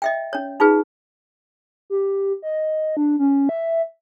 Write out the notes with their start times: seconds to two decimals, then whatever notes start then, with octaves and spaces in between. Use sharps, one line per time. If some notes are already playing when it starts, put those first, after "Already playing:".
0.02 D#5 E5 G5
0.33 C#4 C#5
0.60 D#4 F4 G#4 B4
1.90 G4
2.42 D#5
2.97 D4
3.19 C#4
3.49 E5